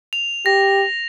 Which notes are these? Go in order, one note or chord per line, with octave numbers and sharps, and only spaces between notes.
F7
G4 A#6